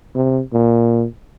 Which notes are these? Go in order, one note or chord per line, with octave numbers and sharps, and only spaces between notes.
C3
A#2